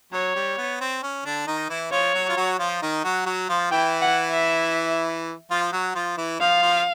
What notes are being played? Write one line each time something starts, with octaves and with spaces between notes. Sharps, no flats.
F#3 C#5
G3
B3
C4
C#4
D3 D4
D#3 D#4
E3 E4
F3 F4 C#5
F#3 F#4
F4
F#3 F#4
F3 F4
D#3 D#4
F#3 F#4
F#3 F#4
F3 F4
E3 E4 G5
F#5
E5
F3 F4
F#3 F#4
F3 F4
E3 E4
F3 F4 F5
F3 F4